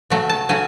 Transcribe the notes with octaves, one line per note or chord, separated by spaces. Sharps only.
C#3 F#3 A3
A5
C#3 F#3 A3 G#5